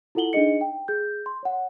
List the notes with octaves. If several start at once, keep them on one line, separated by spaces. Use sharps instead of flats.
E4 F4 A4 F#5 F#7 G7
D4 D#4 G#4 D#5 C#7
G5
G#4 G6
C6
C#5 F#5